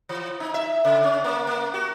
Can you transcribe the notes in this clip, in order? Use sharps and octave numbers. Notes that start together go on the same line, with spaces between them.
E3
D#4
E5
C#3
C#4
A#3
A#3
F#4